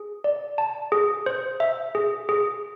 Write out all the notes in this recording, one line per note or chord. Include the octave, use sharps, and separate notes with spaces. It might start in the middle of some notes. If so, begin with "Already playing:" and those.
Already playing: G#4
D5
A5
G#4
C5
E5
G#4
G#4